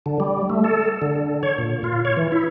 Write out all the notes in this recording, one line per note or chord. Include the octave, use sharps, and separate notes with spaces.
D3
G3
A3
A4
D3
C#5
A#2
F4
C#5
E3
E4